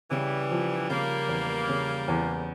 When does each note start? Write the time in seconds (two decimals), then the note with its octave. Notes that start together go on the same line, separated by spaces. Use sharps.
0.11 C#3 E3 G3
0.51 F3
0.90 C#3 G3 A#3
1.28 E2
1.69 C#3
2.08 E2